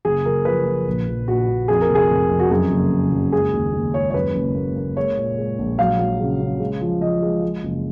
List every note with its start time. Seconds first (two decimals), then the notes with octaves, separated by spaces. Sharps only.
0.05 F#1 G#4
0.25 F#1 A#4
0.45 F3 B4
0.66 F3
0.87 A#1
1.08 A#1
1.28 A#1 F#4
1.48 A#1
1.68 F2 G#4
1.81 A#4
1.90 F1
1.95 G#4
2.10 F1
2.30 F2
2.40 F#4
2.50 F#2 G#4
2.70 F#1
2.92 F#1
3.13 F#1
3.32 G#3 G#4
3.53 D#2
3.73 D#2
3.94 G#3 C#5
4.10 C#5
4.14 F#2 B4
4.35 F#1
4.55 A#3
4.76 A#3
4.97 G#3 C#5
5.16 A#2
5.38 G#3
5.59 A#1
5.78 F#3 F5
5.99 F#3
6.20 C#3
6.40 C#3
6.60 G#3
6.81 F3
7.01 F3 D#5
7.22 G#3
7.43 G#3
7.63 F#1